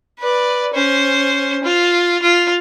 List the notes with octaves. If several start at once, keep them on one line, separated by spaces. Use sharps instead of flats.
B4 D5
C#4 C5
F4
F4